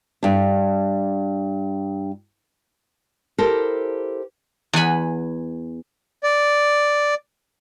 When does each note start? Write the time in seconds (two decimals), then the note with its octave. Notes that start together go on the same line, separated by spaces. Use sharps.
0.23 G2 D4
3.38 E4 G4 A4 A#4 C5
4.73 E2 F#5 G#5 B5
6.24 D5